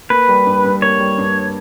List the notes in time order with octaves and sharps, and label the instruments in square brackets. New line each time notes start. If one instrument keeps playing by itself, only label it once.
[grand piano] A#3 [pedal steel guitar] B4
[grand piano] G3
G2
G2
[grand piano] A#3 [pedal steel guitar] C#5
[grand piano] G3
G2